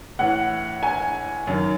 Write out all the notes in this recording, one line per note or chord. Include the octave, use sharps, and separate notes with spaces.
A2 E3 F#5
G#5
F#2 D#3